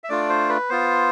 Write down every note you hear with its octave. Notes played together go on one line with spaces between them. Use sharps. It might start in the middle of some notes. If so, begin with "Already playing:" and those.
E5
A3 D4 F4 D5
C5
B4
B3 F4 C5